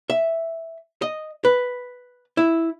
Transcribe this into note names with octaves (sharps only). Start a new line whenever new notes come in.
E5
D#5
B4
E4